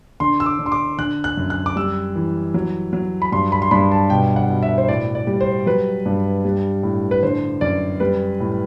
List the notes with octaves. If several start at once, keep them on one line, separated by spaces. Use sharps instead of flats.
D3 C6
E6
D6
D3
C6
D6
D3 F#6
F#6
F#2
F#6
D6
G3 E6
E3
F#3
F#3
B5
G2 C6
B5
C6
G2 B5
A5
B2 G5
F#5
B2
E5
C5
A2 D5
D5
G3
C5
F#3 B4
G2
G3
A2
B4
D3 C5
F#2 D5
G3 B4
A2